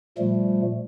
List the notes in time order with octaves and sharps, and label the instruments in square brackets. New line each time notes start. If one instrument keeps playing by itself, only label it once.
[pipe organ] A#2 F3 G3 A3